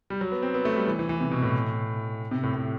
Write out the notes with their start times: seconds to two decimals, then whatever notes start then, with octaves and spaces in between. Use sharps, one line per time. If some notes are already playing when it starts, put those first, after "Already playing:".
0.10 G3
0.21 F#3
0.31 B3
0.42 C4
0.54 B3
0.65 A3
0.76 G3
0.87 E3
0.99 E3
1.09 E3
1.20 C3
1.31 B2
1.42 A2
2.31 C3
2.43 A2
2.54 A2